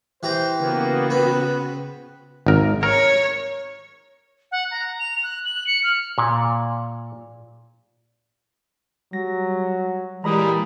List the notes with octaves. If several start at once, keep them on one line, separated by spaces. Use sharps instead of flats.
E3 G4 C5 A#5
C#3 A#3 B3 F#4
C4 B4
G#1 A#4
A#4 C#5
F#5
A#5
F7
F#6
F#7
C#7
F6
A#2
F#3 G3 A#6
A#2 E3 G3 G#3 A#5 B5 D#6